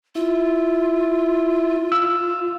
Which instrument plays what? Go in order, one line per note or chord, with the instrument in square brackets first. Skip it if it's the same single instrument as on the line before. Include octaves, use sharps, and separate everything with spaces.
[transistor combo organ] E4 [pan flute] F4
[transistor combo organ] F5 [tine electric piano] E6